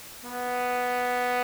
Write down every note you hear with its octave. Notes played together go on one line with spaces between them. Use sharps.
B3